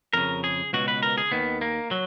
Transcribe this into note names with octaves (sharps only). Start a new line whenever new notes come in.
F2 C#3 A#4
G#4
C#2 B2 F#4
B4
A#4
G#4
D#2 D#3 B3
A#3
F#3